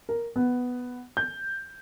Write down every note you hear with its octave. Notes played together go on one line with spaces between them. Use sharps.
A#4
B3
G6